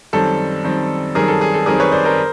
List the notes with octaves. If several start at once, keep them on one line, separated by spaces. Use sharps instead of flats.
F#2 D#3 G3 C4 A4
F#2 D#3 G3 C4
F#2 D#3 G3 C4 G#4 A#4
A4
G#4
A4
F#2 D#3 G3 C4 G#4 A#4
B4 C#5
C5 D5
A#4 C5